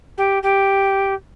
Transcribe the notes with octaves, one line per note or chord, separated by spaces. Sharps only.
G4
G4